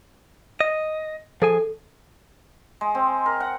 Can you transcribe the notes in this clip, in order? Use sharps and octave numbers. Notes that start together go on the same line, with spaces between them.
D#5
F3 G#4 A4 G#5
G#3
C4
A#4
F#5